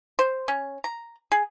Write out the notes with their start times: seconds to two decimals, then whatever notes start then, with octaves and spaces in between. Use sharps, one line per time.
0.19 C5
0.48 C#4
0.84 A#5
1.32 G#4